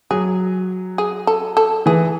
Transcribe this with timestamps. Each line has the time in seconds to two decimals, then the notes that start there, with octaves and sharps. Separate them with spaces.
0.11 F#3 G#4
0.98 G#4
1.27 A4
1.57 A4
1.86 E3 G#4